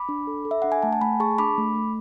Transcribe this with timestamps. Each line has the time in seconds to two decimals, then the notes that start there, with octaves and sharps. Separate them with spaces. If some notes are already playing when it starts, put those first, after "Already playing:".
Already playing: B5 D6
0.09 D4
0.27 A4
0.45 A4
0.51 E5
0.62 D4 F#5
0.72 G#5
0.82 A3 F#5 A5
0.93 A5
1.01 A3 G#5 B5
1.20 G#4 A5 C#6
1.38 D4 B5 D6
1.58 A3
1.76 A3